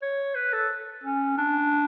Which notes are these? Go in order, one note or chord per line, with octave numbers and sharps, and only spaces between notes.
C#5
B4
A4
C#4
D4